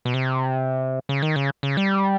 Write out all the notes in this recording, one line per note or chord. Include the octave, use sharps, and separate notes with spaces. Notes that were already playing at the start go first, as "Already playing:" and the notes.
B2
C3
C#3
D#3
C#3
C#3
G3